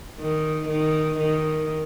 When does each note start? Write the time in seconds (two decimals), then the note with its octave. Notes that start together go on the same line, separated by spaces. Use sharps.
0.19 D#3
0.69 D#3
1.19 D#3